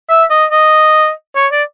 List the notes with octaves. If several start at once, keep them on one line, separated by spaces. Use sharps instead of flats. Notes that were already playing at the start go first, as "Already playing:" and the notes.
E5
D#5
D#5
C#5
D5